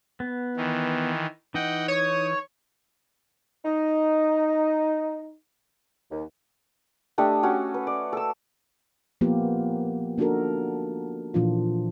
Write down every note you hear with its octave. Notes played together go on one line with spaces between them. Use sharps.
B3
D#3 E3
E3 D#4 D#5 F#5 G5
C#5 D#6
D#4
D#2
A3 D4 G4 D#5
C#4 F#4
B4
D5
A4 E6
F3 A#3 B3 F4 G4 A#4
A#3 D4 D#4 F#4 A4 A#4
A#2 E3 F3 D4 F4